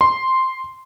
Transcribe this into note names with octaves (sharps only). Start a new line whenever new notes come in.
C6